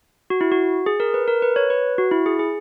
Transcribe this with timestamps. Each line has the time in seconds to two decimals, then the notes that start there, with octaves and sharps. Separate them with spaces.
0.30 F#4
0.41 E4
0.52 F#4
0.86 G#4
1.00 A#4
1.14 B4
1.28 A#4
1.42 B4
1.56 C#5
1.70 B4
1.98 F#4
2.11 E4
2.26 G#4
2.39 G#4